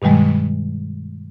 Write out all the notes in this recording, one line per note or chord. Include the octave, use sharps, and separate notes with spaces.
G2 B2 D#3 G3 G#3